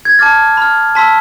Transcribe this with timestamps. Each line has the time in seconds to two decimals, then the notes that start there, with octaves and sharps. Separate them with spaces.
0.05 G#6
0.19 A5 D6 F6 A6
0.57 B5 F6
0.95 A5 C6 E6 B6